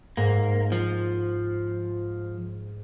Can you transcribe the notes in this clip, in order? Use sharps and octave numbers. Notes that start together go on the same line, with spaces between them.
G#2 A#3
F3